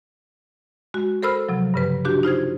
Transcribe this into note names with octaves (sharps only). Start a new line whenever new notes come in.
G#3 F#4
A4 A#4 C5 B5 E6 F6
C3 F3 F#3
G2 C#3 B4
D4 F#4 G4
D#4 F4 C5 G#6